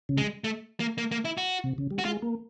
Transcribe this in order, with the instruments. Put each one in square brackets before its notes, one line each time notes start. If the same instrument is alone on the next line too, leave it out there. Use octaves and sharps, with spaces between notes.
[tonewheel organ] C#3
[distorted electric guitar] G#3
A3
A#3
A#3
A#3
E4
F#4
[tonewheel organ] C3
C#3
G3
[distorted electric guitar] F#4
[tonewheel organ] G#3 [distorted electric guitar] F4
[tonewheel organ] A#3